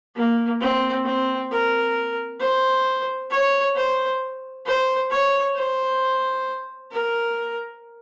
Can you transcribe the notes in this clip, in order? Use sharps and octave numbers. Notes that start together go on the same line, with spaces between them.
A#3
C4
C4
A#4
C5
C#5
C5
C5
C#5
C5
A#4